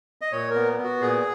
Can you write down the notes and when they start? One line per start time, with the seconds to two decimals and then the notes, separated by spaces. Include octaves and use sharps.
0.21 D#5
0.32 A#2 C#5
0.50 A#4
0.55 B3
0.78 B3
0.84 F#4
1.01 A#2 G#4